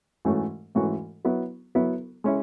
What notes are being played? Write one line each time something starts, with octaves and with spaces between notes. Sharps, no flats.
G#2 E3 A3 C#4 F#4
G#2 E3 A3 C#4 F#4
F#3 B3 E4
F#3 B3 E4
G#3 C#4 E4